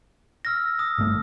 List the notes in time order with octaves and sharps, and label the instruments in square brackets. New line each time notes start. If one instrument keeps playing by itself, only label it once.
[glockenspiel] E6 F6 A#6
D#6 E6
[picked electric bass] G1 A3